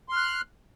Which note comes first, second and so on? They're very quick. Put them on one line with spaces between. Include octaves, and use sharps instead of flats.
C6 F6 F#6